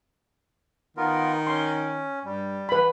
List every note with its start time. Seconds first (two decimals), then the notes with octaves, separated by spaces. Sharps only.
0.97 D#3 B3 F4 A#4
1.47 C#4 C6
2.25 G2 G3
2.69 E3 B4 B5